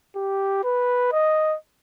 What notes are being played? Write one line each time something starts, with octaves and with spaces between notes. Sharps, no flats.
G4
B4
D#5